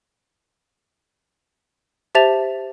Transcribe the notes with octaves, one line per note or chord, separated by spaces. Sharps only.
G4 C5 E5 A5 A6 F7